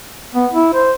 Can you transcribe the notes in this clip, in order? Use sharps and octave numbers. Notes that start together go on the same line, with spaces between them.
B3
E4
C5